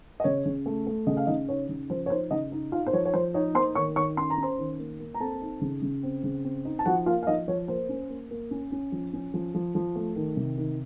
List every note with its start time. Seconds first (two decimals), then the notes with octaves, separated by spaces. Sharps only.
0.20 D#5
0.24 C#3 C#5
0.45 C#3
0.66 A3
0.87 A3
1.07 C#3 D#5
1.17 F5
1.27 C#3 D#4 D#5
1.48 D#4 C#5
1.69 C#3
1.90 F3 C5
2.06 C#5
2.10 D#4 C5
2.31 C#3 D#4 D#5
2.52 D#4
2.72 D#4 F4 F5
2.87 C5
2.93 F3 C#5
3.05 C#5
3.14 F3 C5
3.34 D#4 C#5
3.55 A#3 C5 C6
3.75 D#3 C#5 C#6
3.96 D#3 C#5 C#6
4.17 C#4 C6
4.30 A#5
4.37 C#4
4.43 C5 C6
4.59 D#3
4.79 A#3
5.00 A#3
5.14 A#5
5.20 C4 A4 A5
5.41 D#4
5.61 C#3
5.82 C#3
6.03 C4
6.24 C#3
6.44 C4
6.65 D#4
6.79 A5
6.86 F3 F#4 F#5
7.06 A#3 F4 F5
7.23 F5
7.27 F3 D#4 D#5
7.48 F3 C#5
7.68 A#3 C5
7.89 C#4
8.09 A#3
8.31 A#3
8.51 C#4
8.72 C#4
8.92 F3
9.13 C#4
9.34 F3
9.55 F3
9.75 F3
9.96 A3
10.16 D#3
10.37 C3
10.58 D#3